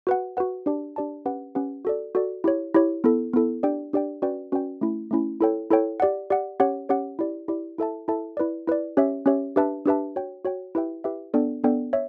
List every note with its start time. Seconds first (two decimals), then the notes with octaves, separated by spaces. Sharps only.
0.07 F#4 B4 F#5
0.37 F#4 B4 F#5
0.66 D4 G4 D5 A5
0.96 D4 G4 D5 A5
1.25 C#4 G4 B4 F#5
1.55 C#4 G4 B4 F#5
1.85 F#4 A4 D5
2.15 F#4 A4 D5
2.44 E4 G4 C#5
2.74 E4 G4 C#5
3.04 B3 E4 A4
3.33 B3 E4 A4
3.63 D4 G4 D5 G5
3.93 D4 G4 D5 G5
4.22 C#4 F#4 B4 D5 G5
4.52 C#4 F#4 B4 D5 G5
4.81 A3 C#4 E4
5.11 A3 C#4 E4
5.41 E4 A4 C#5 G5
5.70 E4 A4 C#5 G5
6.00 G4 D5 F#5
6.30 G4 D5 F#5
6.60 C#4 G4 C#5 F#5
6.89 C#4 G4 C#5 F#5
7.19 E4 G4 D5
7.48 E4 G4 D5
7.78 E4 A4 E5 A5
8.08 E4 A4 E5 A5
8.37 E4 B4 D5
8.68 E4 B4 D5
8.97 C#4 G4 C#5 E5
9.26 C#4 G4 C#5 E5
9.56 D4 G4 B4 E5 A5
9.86 D4 G4 B4 E5 A5
10.16 F#4 C#5 G5
10.45 F#4 C#5 G5
10.75 E4 G4 B4 E5 G5
11.04 E4 G4 B4 E5 G5
11.34 B3 D4 A4 D5 G5
11.64 B3 D4 A4 D5 G5
11.93 C#5 E5